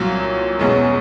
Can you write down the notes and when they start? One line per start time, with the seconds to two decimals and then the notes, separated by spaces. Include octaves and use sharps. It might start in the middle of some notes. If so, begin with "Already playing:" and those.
Already playing: C2 A#2 F#3
0.59 E2 B2 G#3 C#4